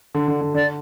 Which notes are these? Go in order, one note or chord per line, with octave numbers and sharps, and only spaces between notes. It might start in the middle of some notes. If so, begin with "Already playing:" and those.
D3
D3
D3
D3 D5